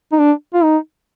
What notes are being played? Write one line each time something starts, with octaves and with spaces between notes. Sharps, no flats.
D#4
D4
F4
D#4